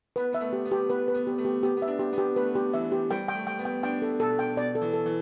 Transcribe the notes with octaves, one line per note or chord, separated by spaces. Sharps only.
B3 B4
B3 E5
A3
G4
B3
G4
B3 B4
B4
B3
G4
A3
G4
B3 G4
B3
E5
D4
G4
B3
G4
A3 B4
G4
E3 E5
G4
G3 G5
G5
A3
G5
B3
G5
D4 G5
A4
B2 A4
G5
B2 D5
A4
E3
A4
E3